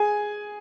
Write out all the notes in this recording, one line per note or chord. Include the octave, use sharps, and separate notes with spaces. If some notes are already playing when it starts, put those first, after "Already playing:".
Already playing: G#4 G#5